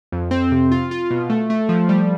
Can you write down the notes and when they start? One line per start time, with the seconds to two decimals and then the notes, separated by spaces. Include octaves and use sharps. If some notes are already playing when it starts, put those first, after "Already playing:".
0.12 F2
0.31 C4
0.52 C3
0.72 F4
0.91 F4
1.11 B2
1.30 A3
1.50 A3
1.69 F3
1.89 G3